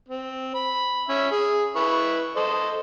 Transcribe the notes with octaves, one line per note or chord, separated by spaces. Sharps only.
C4
B5
C#4 E5
G#4
E4 B4 C#6
A4 C5 D#5